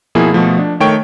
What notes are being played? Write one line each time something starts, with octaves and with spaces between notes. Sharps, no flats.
B2 F3 A#3 E4 G#4
B2 F3 A3
D4
D#3 A3 C#5 G5 C#6 D7